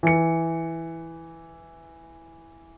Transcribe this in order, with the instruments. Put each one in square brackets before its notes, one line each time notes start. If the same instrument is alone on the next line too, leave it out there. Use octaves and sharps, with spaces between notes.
[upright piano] E3 C#7